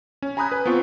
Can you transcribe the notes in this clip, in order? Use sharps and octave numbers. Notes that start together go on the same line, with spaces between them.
C#4
G#5 A#5 B5 D#6 F#6 G6
B4
B3 C4 F4 C#6